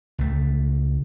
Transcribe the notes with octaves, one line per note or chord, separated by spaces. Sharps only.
C#2 A3